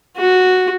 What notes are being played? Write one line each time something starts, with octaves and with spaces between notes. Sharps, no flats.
F#4